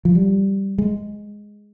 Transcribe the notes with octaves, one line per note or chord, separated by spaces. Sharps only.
F3
G3
G#3